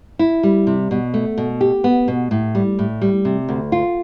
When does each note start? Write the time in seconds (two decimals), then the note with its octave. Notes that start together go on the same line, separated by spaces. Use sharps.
0.19 E4
0.43 G3
0.67 C3
0.91 B2
1.14 A3
1.38 B2
1.61 G4
1.84 B3
2.08 B2
2.31 A2
2.55 G3
2.79 A2
3.02 G3
3.25 C3
3.48 D2
3.72 F4